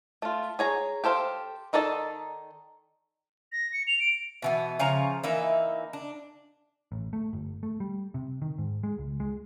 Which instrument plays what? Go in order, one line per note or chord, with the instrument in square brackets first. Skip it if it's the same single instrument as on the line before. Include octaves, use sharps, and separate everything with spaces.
[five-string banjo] A3 F4
G#4 C#5 A#5
G4 A4 C5 F5
D#3 D#4 A4 D5 A5
[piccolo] A#6
C#7
F7
D7
[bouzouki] B2 E3 B3
C#3 F3 C#5 A#5
E3 A#3 D#4 E5
D4
[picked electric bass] A1
A3
G1
A3
G3
C3
D#3
G#2
G#3
C#2
G#3